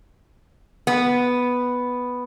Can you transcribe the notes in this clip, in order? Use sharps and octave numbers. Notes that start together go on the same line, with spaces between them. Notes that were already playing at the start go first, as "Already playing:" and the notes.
B3